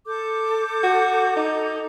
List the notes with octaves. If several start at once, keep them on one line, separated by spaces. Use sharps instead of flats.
A4 D6 G6
F#4
D#4